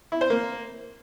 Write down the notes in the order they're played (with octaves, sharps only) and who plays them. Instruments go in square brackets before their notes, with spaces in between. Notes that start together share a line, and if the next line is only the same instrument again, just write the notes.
[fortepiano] E4
C5
A#3